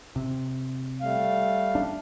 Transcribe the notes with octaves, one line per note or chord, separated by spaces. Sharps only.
C3
G3 A3 F5
D4